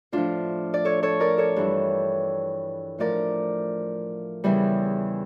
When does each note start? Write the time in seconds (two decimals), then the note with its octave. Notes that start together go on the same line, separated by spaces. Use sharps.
0.12 A2 F3 D4 F4
0.74 D5
0.85 A4 C#5
1.03 A4 C#5
1.20 A#4 D5
1.38 A4 C#5
1.56 G2 E3 G3
2.99 A2 F3 A#4 D5
4.44 E2 C#3 E3 G3